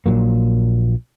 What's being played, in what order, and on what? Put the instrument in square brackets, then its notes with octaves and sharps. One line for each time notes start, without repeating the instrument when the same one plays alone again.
[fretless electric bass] A#1 A#2 F#3 A#3